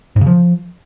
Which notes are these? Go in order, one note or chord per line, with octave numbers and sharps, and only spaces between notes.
G#2
C#3
F3